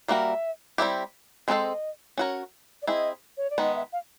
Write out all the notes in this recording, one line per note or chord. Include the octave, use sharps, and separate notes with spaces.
G3 A#3 D4 F#4 A#4 E5
G3 C4 E4 G4
G#3 C4 E4 A4 C5 D#5
C#4 F#4 A#4 C#5
D5
C4 E4 G#4 D#5
C#5
D5
D#3 G#3 B3 D#5
E5
F5